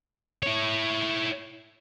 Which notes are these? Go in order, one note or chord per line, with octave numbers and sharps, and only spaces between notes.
E4 C#5